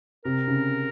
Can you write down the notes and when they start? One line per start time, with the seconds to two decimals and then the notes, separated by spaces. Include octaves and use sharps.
0.25 C3 A#4
0.48 C#3